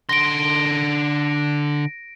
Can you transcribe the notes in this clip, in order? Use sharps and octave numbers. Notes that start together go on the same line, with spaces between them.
D3 C6 A#6 D7